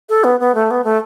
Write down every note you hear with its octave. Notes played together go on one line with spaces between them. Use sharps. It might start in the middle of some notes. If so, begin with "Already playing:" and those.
A4
B3
B3
A3
B3
A3